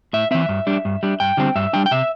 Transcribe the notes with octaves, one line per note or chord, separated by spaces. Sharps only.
A2 E5
E3 C4 E5
G2
G3 D4
G2
G3 D4
G2 G5
D3 G3 C4
G2 E5
G3 D4 G5
G5
C3 E5